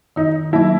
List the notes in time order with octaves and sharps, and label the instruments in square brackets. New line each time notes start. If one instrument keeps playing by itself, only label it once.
[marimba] D#3 [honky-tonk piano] D#4
[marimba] F#3 A#3 D#4 [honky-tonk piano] E4